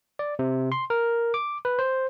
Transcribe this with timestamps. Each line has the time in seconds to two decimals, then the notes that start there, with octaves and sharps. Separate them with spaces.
0.19 D5
0.39 C3
0.72 C6
0.90 A#4
1.34 D6
1.65 B4
1.79 C5